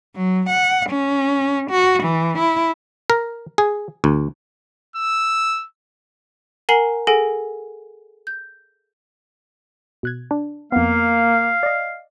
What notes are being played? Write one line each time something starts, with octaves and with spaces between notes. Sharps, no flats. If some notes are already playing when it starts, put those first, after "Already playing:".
F#3
F#5
C#4
F#4
E3
E4
A#4
G#4
D2
E6
A#4 F#5 G#5 A#5 C7 F#7
G#4 A4 F#5 G#5 A#6 D7
G6
B2 F#6 G#6
D4
F2 A#3 B3 F5
D5 D#5